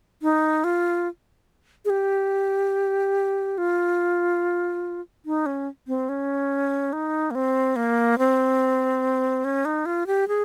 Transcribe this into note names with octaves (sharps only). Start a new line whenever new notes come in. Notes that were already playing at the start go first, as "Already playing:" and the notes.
D#4
F4
G#4
G4
F4
D#4
C#4
C4
C#4
D#4
A#3
C4
A#3
C4
C#4
D#4
F4
G4
G#4